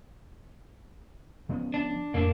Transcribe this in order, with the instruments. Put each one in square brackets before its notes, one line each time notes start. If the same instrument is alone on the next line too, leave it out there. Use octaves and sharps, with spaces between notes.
[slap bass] F3 B3 C#4
[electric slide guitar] D4
[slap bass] F2 A2 [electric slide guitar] A#3 D4